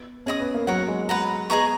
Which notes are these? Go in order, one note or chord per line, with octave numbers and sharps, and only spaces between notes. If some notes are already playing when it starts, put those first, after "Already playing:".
Already playing: B3
C#4 G#4 D#5 A#5 D#6
B3
A#3
F#3 A#4 C#5 F#5
G#3
G#3 B4 F#5 A#5
B3 G#4 D#5 A#5 C#6